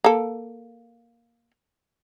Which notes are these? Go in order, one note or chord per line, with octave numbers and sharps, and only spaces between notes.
A#3 A4